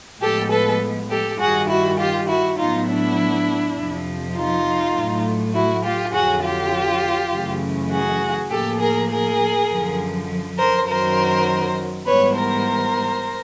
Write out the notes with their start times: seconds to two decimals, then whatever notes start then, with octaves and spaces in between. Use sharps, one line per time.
0.21 A2 F3 G#3 B3 G4 A4
0.51 A4 B4
1.10 G4 A4
1.39 G2 D#3 G3 F#4 G#4
1.69 E4 F#4
1.98 F4 G4
2.28 E4 F#4
2.58 A2 F#3 B3 D#4 F4
2.87 D4 E4
3.76 F2 C3 F3
4.36 D#4 F4
4.95 A2 F#3 A3
5.54 E4 F#4
5.84 F4 G4
6.13 F2 D3 F#3 F#4 G#4
6.44 F4 G4
7.33 F#2 C#3 E3 A3
7.91 F#4 G#4
8.50 A2 F3 A#3 G4 A4
8.80 G#4 A#4
9.09 G#4 A#4
9.69 F#2 D3 F3
10.58 A#4 C5
10.87 F#2 D#3 F#3 A#4 C5
12.05 G#2 E3 G3 B3 B4 C#5
12.36 A#4 C5